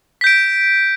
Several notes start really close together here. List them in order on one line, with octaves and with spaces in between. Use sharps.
B6 G6 D7